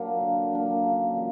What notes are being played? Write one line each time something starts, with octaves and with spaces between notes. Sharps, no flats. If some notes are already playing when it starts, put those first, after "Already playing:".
Already playing: F#3 A#3 D4
D3
F#3 A#3 D4
C#3
F3 G#3